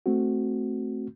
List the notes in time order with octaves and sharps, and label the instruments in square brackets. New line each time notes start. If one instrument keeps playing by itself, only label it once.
[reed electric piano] A3 C4 F#4